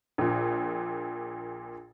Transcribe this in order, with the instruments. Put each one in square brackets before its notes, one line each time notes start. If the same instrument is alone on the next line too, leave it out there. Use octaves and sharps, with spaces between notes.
[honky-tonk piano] A#1 A#2